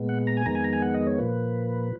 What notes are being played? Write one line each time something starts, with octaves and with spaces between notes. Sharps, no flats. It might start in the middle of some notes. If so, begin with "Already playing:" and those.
Already playing: A#2 G#3 B3
F#5
A#5
G#5
F2 D#3 G#3 B3 A#5
G#5
A#5
G#5
F#5
D#5
C#5
A#2 F3 A#3 B4